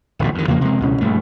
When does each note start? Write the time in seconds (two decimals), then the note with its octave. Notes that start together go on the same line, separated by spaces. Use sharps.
0.19 D1 A1 B2
0.35 F2 D#3
0.48 E2 C#3 F3 A#3
0.61 C3 G#3
0.80 C#2 B2 C#4
1.01 A#1 G2 A3